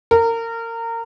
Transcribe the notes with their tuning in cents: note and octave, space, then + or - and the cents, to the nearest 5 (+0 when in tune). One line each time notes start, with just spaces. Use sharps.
A#4 -25